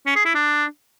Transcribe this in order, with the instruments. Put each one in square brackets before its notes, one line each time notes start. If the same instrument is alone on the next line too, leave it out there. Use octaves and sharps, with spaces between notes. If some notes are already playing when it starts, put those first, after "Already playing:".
[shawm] C#4
G#4
E4
D4